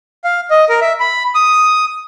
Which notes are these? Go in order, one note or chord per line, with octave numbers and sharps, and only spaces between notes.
F5
D#5
A#4
E5
B5
D#6